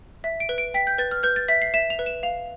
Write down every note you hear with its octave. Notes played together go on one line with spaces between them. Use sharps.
E5
D7
B4
D7
G5 B6
G6
B4 A6
F6
B4 G6
A6
E5 B6
C7
E5 E7
F7
B4
E7
F5 F7